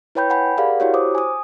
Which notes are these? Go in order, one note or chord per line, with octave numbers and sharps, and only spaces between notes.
E4 B4 C#5 G5 B5 G6
F#5 G#5 B5
G4 G#4 A#4 D5 F5 F#5
E4 F#4 G4 C#5
C5 D6 D#6
G#5 D#6